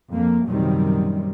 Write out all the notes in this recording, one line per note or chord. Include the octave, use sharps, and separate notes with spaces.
F2 A#3
A#1 F#2 C3 D#3 G3